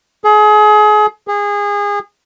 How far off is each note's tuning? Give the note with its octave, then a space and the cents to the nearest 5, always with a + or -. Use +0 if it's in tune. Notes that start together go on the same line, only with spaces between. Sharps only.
G#4 +30
G#4 -25